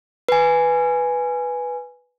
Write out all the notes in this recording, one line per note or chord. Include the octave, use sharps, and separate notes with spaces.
B4 G#5